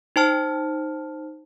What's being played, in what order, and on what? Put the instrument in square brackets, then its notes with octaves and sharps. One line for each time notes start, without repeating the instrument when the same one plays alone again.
[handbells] D#4 C5 A5 F6